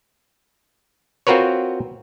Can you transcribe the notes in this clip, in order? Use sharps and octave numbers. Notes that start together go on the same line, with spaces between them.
C4 F4 F#4 A#4 B4 C#5